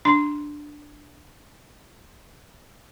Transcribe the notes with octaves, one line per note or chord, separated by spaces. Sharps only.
D4 C6